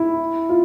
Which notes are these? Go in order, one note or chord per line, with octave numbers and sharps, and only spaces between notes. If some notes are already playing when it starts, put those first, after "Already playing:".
Already playing: E4
F4